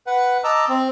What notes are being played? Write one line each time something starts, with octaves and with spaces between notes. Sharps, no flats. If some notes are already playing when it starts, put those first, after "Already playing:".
B4 F#5
D#5 A5 A#5 D6 E6
C4